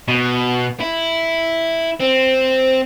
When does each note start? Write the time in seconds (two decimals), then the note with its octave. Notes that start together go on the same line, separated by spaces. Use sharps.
0.08 B2
0.81 E4
2.00 C4